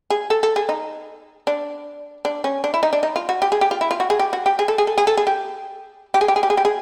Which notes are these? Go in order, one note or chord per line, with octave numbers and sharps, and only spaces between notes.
G#4
A4
A4
G#4
D#4
D4
D4
C#4
D4
E4
D#4
D4
D#4
F4
F#4
G4
G#4
G4
F4
E4
F4
F#4
G#4
G4
F#4
G4
G#4
A4
G#4
A4
G#4
A4
G#4
G4
G4
G#4
G4
G#4
G4
G#4
G4
G#4